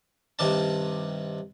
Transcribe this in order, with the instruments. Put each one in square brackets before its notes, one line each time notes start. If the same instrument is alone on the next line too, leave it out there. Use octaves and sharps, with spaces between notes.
[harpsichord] G2 C3 D#3 D4 A5